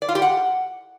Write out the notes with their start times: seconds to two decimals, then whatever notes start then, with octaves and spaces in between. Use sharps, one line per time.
0.02 D5
0.09 F4
0.15 G4
0.22 F#5